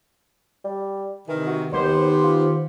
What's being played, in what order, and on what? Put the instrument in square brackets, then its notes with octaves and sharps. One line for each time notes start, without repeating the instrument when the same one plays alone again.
[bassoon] G3
[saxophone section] C3 D#3 [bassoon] E3
[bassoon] F#4
[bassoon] D#2 [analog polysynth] D#3 C5 [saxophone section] B3 G4
[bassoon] F4